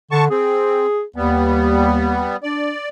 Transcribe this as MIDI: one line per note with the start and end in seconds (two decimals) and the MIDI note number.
0.11 0.25 50
0.11 0.25 81
0.11 0.25 85
0.30 0.86 60
0.30 1.02 68
1.16 2.27 39
1.16 2.36 55
1.16 2.36 59
2.43 2.72 62
2.43 2.89 74